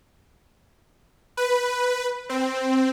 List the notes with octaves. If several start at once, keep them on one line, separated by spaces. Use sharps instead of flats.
B4
C4